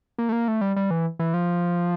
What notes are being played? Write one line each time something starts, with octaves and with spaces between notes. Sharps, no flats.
A#3
A3
A#3
A3
G3
G3
E3
E3
F3